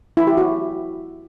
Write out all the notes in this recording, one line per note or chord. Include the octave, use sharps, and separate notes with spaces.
E4
G4
F#4